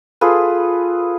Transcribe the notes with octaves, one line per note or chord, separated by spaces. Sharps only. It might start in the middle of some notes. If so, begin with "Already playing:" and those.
F4 G#4 A4 B4